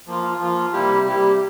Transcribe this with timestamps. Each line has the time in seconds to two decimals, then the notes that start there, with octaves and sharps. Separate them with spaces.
0.07 F3 A#3 F4
0.39 F3 A#3 F4
0.73 C3 G3 A#3 E4 G4
1.05 C3 G3 A#3 E4 G4